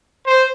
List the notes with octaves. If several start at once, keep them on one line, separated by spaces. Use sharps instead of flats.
C5